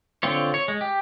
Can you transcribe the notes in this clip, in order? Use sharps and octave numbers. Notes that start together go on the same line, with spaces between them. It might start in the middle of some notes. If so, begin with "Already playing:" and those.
D3 C4 F4 C#5
C#5
G#3
G4